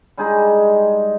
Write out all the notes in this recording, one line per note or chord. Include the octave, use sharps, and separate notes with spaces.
G3 G#3 D#4 G#4